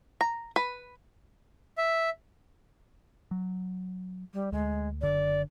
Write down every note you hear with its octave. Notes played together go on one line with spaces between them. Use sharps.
A#5
B4
E5
F#3
G3
D2 G#3
F#1 D3 D5